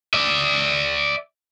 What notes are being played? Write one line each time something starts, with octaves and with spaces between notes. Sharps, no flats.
D5 E5